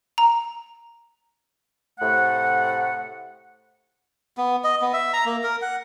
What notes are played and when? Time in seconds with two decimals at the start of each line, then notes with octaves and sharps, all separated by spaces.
0.18 A#5
1.99 A2 C3 A3 F#5
4.37 B3
4.64 D#5
4.81 B3
4.93 E5
5.13 A#5
5.26 A#3
5.43 A#4
5.62 F#5